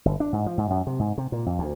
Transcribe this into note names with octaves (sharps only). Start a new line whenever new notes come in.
G1
D4
G#2
F3
G#2
F#2
C3
G#2
C3
A#2
F2
D2